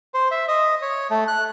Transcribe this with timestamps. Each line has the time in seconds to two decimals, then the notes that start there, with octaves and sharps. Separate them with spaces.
0.14 C5
0.31 E5
0.48 D#5
0.82 C#5
1.10 A3
1.28 F#6